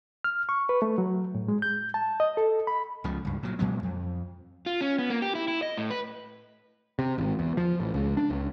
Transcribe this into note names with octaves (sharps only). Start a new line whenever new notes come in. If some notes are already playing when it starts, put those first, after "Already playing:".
F6
C#6
B4
A3
F#3
A2
G#3
G6
A5
D#5
A4
B5
C#2 C#3 F3
C#2 G2
A#2 F#3
A#2 F#3 G#3 B3
F2
F4
C#4
B3
A#3
G4
E4
E4
D#5
A2
B4
C3
G#1
E2
F3
A1
C#2
D4
C#2